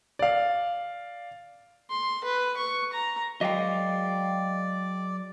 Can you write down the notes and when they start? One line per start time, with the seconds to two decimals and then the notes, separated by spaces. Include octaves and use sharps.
0.19 D5 F5
1.90 C6
2.24 B4
2.57 C#6
2.92 A#5
3.41 F#3 G#3 D5 D#5 F5 G5